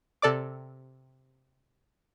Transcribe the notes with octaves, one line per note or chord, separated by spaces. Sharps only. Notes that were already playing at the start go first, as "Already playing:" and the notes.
C3 A4 D5 D6